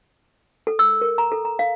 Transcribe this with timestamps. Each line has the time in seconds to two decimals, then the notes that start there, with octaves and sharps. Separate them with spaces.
0.67 A4
0.79 E6
1.01 A#4
1.18 A#5
1.32 A4
1.45 A#5
1.59 F5